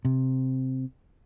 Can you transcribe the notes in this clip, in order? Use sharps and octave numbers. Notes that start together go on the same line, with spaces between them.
C3